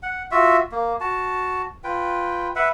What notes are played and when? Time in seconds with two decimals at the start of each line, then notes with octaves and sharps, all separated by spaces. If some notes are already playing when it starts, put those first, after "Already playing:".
0.03 F#5
0.31 F4 F#4 E5
0.72 A#3
1.00 F#4 A5
1.84 F4 B4 G5
2.56 B4 E5 F#5